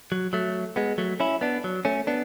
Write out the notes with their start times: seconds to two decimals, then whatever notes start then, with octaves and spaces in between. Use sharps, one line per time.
0.12 F#3
0.33 F#3 A3
0.76 G#3 B3
0.98 F#3 A3
1.20 C#4 E4
1.41 B3 D4
1.64 F#3
1.85 A3 C#4
2.07 B3 D4